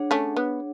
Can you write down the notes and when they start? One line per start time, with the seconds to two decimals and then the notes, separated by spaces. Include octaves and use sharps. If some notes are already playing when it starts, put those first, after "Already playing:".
Already playing: D4 G#4 C#5 F#5
0.11 A3 C#4
0.36 B3